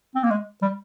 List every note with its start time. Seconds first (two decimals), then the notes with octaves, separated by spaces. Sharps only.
0.15 C4
0.23 A#3
0.31 G#3
0.62 G3